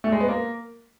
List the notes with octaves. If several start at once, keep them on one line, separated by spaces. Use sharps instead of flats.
A3
G#3
B3
A#3